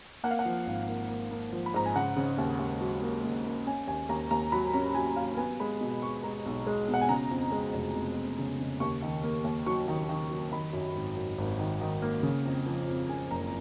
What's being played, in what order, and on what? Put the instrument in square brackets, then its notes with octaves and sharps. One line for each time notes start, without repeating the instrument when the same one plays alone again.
[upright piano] A#3 F#5
F5
F#5
F3
G#1
A#3
A#3
A#3
F3
B5
G#2 A#5
G#5
C#3 F#5
C#3
D#2
D#2
F#3
A#3
D#2
A#3
C#4 G#5
D#2 G#5
D#2 A#5
D#2 A#5
F#3 B5
C#4 A#5
F#3 G#5
F#3 F5
B3 G#5
G#3 B5
B2
G#3 C#6
G#3 A#5
B1
G#3
B2
F#5
G#5
C#3 A#5
F2
G#3
F1
F1
F2
C#3
C#3
D#2 C#6
D#3
A#3
D#2
F#3 C#6
D#3
D#3
F#3
D#3 B5
F#2
G#1
F#2
G#1
D#3
D#3
A#3
C#3
F2
F3
F2
C#3 G#5
F#1 A#5